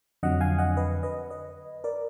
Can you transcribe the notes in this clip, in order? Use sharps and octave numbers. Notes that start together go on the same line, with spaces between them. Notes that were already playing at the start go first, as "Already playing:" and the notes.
F2 D3 F#3 D#5 F#5
F5 G#5
D#5 F#5
B4 D#5
B4 D#5
B4 D#5
A#4 D5